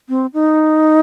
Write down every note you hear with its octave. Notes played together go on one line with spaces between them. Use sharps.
C4
D#4